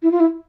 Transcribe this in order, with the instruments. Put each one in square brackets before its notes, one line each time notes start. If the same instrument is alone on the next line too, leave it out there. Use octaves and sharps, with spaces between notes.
[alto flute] E4
F4
E4